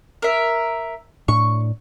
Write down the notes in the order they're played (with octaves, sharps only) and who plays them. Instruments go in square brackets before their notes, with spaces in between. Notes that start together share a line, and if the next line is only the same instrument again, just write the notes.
[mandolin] A#4 E5
[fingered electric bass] A2 D4 [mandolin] C#6